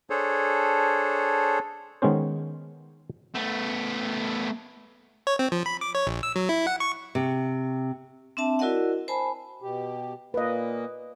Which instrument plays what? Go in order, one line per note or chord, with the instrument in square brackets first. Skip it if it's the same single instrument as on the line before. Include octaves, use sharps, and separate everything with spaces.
[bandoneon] D4 G#4 A4 C5 C#5
[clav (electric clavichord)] D#3 G#3 B3 C#4 C5
[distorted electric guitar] A3 B3
[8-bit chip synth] C#5
C4
F3
B5
D6
C#5
A#1
E6
F#3
E4
F#5
C#6
[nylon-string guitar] C3
[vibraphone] C4 D4 E5 A5
E4 F#4 A#4 D5 D#5 F#5
C5 G#5 A5 B5
[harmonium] B2 G4
[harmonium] A#2 A#3 [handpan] B4 D#5